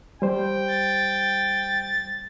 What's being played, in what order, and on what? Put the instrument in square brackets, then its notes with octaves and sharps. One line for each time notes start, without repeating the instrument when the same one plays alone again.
[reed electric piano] G3 C5 [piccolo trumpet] G5
[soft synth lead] A6